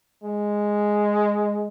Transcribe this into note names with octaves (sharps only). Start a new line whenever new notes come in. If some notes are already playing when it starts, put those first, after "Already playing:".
G#3